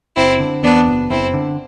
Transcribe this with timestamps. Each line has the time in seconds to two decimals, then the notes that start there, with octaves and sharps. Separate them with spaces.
0.17 F#1 C4 E4
0.40 D3
0.63 E2 B3 D4
0.86 F#1
1.10 F#1 C4 E4
1.34 D3